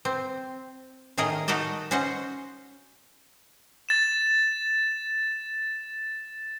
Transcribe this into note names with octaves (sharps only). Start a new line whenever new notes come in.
C4
A2 D#3 G#4 A#4 D#5
D#4 F#4 A#4 D#5 A5
C#4 F#4 C5 D#5 F#5
A6 E7